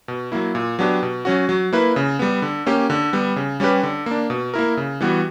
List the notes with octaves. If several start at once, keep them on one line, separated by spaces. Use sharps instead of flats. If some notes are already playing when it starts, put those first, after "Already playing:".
B2
F#3 A#3 E4
A#2
F#3 B3 D4 G4
B2
F#3 C#4 F#4
F#3
A#3 E4 B4
C#3
G3 B3
D3
A#3 C#4 G4
D3
G3 B3
C#3
G3 C#4 G4 B4
D3
A#3 D4
B2
A#3 E4 A#4
C#3
E3 G3 B3 F#4